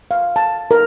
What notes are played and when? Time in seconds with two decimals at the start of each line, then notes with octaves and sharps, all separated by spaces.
0.11 F5
0.36 A5
0.71 A#4